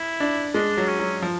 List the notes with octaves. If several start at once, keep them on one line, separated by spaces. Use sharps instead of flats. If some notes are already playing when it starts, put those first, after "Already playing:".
Already playing: E4
D4
G#3 D4
F#3
C#4
F#3
F3